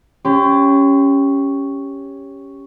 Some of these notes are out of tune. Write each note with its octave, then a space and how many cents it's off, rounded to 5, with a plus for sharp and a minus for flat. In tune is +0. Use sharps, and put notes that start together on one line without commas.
C#4 +0 G4 +5 C6 -35